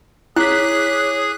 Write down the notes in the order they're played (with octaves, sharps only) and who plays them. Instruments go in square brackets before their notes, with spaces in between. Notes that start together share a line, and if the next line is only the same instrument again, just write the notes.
[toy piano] E4 [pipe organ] G#4 [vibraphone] C#5 D6 [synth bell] F#6 B6